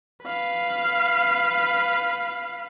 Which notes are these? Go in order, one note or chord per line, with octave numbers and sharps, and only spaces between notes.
B4 F5